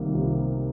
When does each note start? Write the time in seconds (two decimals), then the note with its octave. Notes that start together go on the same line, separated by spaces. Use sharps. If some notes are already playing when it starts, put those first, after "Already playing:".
Already playing: C2 C3 D#3 A#3
0.14 C3